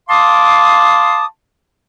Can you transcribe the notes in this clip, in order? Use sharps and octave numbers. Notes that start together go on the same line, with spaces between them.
F5 A5 C6 D6 D#6